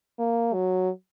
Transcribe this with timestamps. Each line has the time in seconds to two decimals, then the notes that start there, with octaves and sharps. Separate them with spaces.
0.19 A#3
0.53 F#3